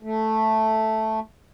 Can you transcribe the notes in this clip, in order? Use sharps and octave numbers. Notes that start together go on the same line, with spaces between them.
A3